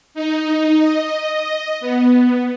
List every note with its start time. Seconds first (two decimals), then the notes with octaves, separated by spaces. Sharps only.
0.14 D#4
0.79 D#5
1.81 B3